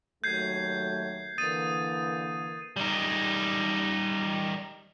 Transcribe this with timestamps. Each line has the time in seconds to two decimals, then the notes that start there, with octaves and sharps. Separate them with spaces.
0.24 D#2 F#3 A3 G6 G#6 C7
1.38 D3 E3 A#3 D#6 A6 D#7
2.77 G3 D#4